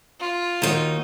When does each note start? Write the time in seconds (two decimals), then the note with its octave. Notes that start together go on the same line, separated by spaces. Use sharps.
0.20 F4
0.62 D#2 D#4 F#4